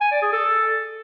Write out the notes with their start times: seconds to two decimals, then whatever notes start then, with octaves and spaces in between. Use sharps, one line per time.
0.01 G#5
0.12 D5
0.22 G#4
0.33 A4